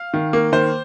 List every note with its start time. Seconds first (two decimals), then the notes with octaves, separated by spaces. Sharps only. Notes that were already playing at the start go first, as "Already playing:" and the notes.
Already playing: F5
0.14 D#3
0.33 A#3
0.52 D#3 C5